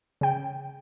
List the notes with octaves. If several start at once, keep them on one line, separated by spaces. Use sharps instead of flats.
C#3 G5